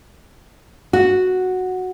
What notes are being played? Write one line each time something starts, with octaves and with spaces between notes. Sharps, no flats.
F#4